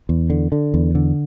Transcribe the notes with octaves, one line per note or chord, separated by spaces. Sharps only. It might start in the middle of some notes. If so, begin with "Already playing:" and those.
E2
D3
D3
E2
D3